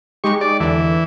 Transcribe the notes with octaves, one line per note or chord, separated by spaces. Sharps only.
G#3 D#4 G4 C#6
D5
E2 D3 E3